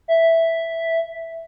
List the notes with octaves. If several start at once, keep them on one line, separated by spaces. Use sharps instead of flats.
E5